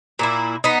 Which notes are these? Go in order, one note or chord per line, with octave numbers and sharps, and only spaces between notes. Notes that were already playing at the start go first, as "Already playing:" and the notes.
A#2 A#3 E4
B3 D#4